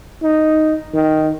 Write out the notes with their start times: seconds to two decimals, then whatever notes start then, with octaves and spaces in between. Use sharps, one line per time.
0.23 D#4
0.94 D#3